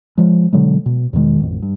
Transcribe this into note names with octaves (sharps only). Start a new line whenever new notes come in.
F3 G#3
B2 D3 F#3 G#3
B2
E2 B2 D#3 G#3
A1 F2
G2